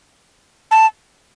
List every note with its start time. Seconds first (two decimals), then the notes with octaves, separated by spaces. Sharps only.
0.71 A5